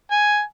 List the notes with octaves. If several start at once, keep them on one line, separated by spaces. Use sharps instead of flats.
G#5